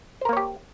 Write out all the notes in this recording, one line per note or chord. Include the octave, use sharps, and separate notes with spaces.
A#3 G4 A#4 C5 C#5